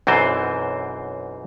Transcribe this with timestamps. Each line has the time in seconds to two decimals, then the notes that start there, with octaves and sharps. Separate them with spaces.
0.07 B1 F#2 E3 C4 C5